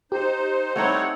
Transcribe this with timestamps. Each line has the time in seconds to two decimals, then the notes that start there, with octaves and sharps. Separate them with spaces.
0.12 D#4 G4 C5
0.76 G3 A3 C4 D#4 C#5 F#5